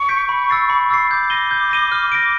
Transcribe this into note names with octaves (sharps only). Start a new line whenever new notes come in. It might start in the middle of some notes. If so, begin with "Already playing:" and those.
Already playing: C#6
G6 B6 D7
B5
E6 A6 C7
B5
E6 A6 C7
D6 G6
A#6 D#7 G7
G6
A#6 D#7 G7
F6
A#6 D7